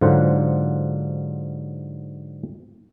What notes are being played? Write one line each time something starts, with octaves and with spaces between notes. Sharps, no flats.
G#2 D3 F#3 F4 C5 F#5